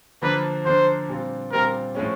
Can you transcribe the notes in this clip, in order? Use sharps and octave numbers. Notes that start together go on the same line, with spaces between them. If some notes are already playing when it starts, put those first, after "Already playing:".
D3 F3 A#3 D4 B4
D3 F3 A#3 D4 C5
A#2 G3 C4 F4
A#2 G3 C4 F4 A#4
A2 F3 G#3 C#4